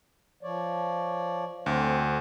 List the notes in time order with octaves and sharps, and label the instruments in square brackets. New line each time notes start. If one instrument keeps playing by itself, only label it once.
[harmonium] F3 C#5 D5
[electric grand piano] D2 [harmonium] C4 C5